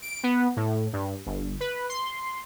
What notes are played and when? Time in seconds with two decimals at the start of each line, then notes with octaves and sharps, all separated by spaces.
0.02 D7
0.23 B3
0.57 A2
0.93 G2
1.26 G1
1.60 B4
1.89 C6